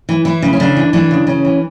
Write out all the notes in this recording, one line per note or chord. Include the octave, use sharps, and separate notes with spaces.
E3
E3 E4
C#3
C#4
C#3 D4
E3
E3 D4
C#3
C#3 C#4
E3